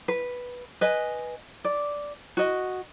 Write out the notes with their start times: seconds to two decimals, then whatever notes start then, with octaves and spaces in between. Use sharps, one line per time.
0.08 B4
0.81 B4 D#5 G#5
1.64 D5
2.37 F#4 D#5